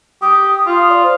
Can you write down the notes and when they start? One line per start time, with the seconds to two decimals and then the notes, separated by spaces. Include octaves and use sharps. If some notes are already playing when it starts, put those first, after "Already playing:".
0.22 G4 D#6
0.67 F4
0.90 D5
1.03 C5